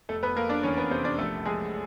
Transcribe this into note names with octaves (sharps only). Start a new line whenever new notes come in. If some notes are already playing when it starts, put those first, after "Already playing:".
F1 A3 A4
B3 B4
F3 A#3 A#4
D4 D5
E2 C#4 C#5
B3 B4
C3 C4 C5
D4 D5
A#1 A3 A4
A#1 G#3 G#4